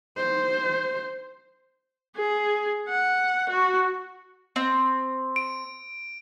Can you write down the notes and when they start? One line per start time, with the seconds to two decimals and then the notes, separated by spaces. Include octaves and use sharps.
0.17 C5
2.16 G#4
2.88 F#5
3.49 F#4
4.56 C4
5.36 D7